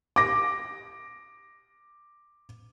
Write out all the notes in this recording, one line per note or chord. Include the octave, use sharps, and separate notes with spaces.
D6 A#6